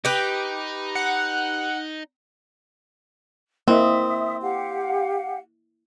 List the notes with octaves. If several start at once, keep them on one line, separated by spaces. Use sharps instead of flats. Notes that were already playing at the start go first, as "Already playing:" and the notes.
D#4 G4 B4
F#5
A#3 C4 E4 D#5 E5 D#6
G4 F5 F#5